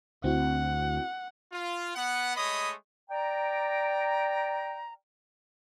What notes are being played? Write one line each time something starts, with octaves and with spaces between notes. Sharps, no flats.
D2 C4 E4 F#4 F#5
F4
B3 F#5
G#3 A3 C#5 D#5 B5 D#6
D5 G5 A#5